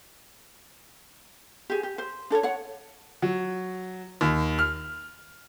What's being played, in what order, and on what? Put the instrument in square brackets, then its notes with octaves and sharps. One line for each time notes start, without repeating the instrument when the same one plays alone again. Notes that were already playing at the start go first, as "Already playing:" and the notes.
[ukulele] G4 G#4
G4
C5
D4 A4 A#4 C#5
C#5 F#5
[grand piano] F#3
D#2
F6